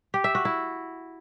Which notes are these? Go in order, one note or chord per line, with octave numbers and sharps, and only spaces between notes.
G4
E5
F#4
E4